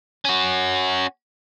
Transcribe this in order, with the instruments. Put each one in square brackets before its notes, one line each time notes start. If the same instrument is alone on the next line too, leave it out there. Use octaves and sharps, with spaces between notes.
[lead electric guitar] C#4 F#4